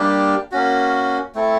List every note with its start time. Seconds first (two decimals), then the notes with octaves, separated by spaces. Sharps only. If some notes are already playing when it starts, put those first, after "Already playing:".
Already playing: G3 A#3 D4 G4
0.52 A#3 C#4 F#4
1.35 A3 C4 E4 A4